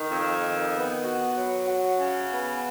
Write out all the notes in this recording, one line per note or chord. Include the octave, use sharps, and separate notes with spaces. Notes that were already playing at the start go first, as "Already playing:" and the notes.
Already playing: D#3
F2
D#3
B3
F#4
F#3
F#4
C#3
B3